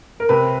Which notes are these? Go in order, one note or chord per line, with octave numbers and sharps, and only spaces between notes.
A#4
C3 B4